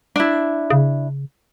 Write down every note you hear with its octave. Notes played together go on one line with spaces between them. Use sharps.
D4 E4
C#3